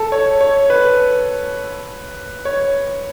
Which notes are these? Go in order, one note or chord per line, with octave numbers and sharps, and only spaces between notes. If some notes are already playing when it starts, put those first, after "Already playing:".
Already playing: A4
C#5
C#5
B4
C#5